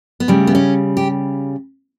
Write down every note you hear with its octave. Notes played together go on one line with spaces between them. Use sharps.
B3
C#3 G3 A3
B3
C#4
G4